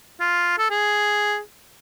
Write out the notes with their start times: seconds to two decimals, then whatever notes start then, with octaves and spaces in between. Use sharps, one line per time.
0.20 F4
0.58 A4
0.70 G#4